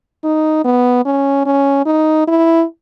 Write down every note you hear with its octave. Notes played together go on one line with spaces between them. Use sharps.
D#4
B3
C#4
C#4
D#4
E4